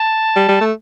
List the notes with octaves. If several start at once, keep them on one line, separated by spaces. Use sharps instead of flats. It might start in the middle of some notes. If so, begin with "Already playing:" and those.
Already playing: A5
G3
G3
A3